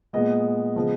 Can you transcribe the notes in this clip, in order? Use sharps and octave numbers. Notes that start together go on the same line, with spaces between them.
A#2 G#3 B3 D#5
C#3 F3 G#3 B3